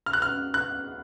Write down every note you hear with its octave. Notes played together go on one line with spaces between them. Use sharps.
F6
F#6
F6
F#6